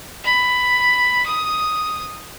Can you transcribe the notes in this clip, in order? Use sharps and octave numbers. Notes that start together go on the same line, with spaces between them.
B5
D#6